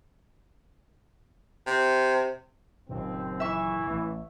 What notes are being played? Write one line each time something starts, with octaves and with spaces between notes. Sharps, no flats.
C3
F#1 D#2 A#2 D#3 C4
E3 E5 C#6
A1 A3